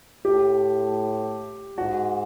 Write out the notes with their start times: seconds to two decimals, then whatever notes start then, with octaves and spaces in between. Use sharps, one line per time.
0.25 A2 G4
1.78 G#2 F#4